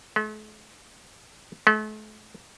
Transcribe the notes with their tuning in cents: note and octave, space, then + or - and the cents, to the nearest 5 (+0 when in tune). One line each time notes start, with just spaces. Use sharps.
A3 -45
A3 -40